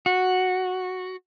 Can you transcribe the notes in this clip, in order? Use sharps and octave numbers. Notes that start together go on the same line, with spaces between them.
F#4